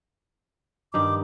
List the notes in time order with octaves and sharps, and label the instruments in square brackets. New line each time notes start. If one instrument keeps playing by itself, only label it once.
[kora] G2 D#3 D#4 [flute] D6